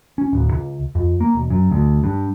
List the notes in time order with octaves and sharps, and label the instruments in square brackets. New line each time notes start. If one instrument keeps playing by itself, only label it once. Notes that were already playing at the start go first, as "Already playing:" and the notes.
[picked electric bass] C#4
D1
C#2
F2
A#3
E1
F#2
D2
G2